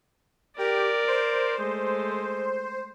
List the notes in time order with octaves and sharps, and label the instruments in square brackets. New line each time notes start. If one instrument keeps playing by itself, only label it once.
[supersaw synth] G4 [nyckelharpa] A#4 D5
[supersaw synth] C5
[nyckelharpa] G#3 A3